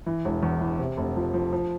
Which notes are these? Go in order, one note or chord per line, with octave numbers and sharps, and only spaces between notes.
E3
E1
E2
E3
C3
F1
F3
F3
F3